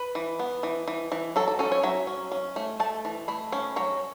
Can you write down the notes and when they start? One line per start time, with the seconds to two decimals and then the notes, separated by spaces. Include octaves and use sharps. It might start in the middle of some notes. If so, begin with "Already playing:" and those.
Already playing: B4
0.15 E3
0.39 B3
0.63 E3
0.88 E3
1.12 E3
1.36 F#3 A4
1.48 A4
1.59 C#4 A4
1.72 C#5
1.83 F#3 E5
2.07 C#4
2.32 C#4
2.56 A3
2.80 A3 A5
3.05 E3
3.28 A3 B5
3.53 C#4
3.76 F#3 C#5